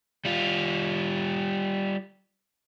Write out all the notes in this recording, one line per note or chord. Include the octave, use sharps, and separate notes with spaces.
G3 F4